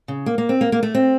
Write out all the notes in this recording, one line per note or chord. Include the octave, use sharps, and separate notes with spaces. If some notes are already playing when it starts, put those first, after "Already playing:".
C#3
A#3
A#3
C4
A#3
A#3
A3
C4